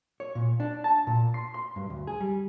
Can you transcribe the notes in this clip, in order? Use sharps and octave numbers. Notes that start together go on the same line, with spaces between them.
C#5
A#2
D4
A5
A#2
C6
C6
G2
D2
G#4
G3